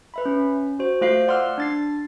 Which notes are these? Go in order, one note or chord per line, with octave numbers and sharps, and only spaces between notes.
B4 E5 B5
C#4
F#4 C5
A3 F4 C5 F5 C7
D5 F#5 C6 D6 E6 F6
D4 A6 C7